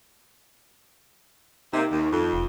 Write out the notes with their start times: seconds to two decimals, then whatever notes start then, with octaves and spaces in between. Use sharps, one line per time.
1.73 C3 A#3 D#4
1.91 D#2
2.11 F2
2.33 E1